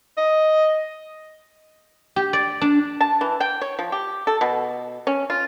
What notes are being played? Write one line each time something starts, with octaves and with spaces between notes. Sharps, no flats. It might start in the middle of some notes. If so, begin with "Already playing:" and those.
D#5
G4
D5
D4
A5
E3
G5
C#5
F3
G4
A4
B2
C#4
F4